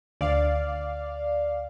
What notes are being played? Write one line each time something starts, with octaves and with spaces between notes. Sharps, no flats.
D2 D5 F5